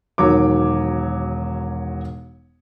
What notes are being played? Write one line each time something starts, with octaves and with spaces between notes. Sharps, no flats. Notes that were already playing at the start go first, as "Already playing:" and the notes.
E1 D#3 F#3 C#5 D6